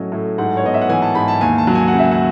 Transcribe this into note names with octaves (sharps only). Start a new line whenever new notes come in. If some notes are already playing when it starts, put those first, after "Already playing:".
Already playing: A2 F#3 C#4 D#5
A2
G#2 F#5
C#5
B3 D#5
E5
F#5
E3 G#5
A5
G#2 B5
A5
D#2 G#5
A5
F#3
G#5
C#3 F#5
E5
F#5